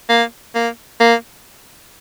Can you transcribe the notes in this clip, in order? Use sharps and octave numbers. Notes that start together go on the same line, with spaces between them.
A#3
A#3
A#3